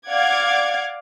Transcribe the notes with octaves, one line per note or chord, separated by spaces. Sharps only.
D5 F5 F#5 D6 G#6